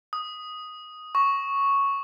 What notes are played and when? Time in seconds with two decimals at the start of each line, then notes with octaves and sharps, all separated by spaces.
0.13 D#6
1.15 C#6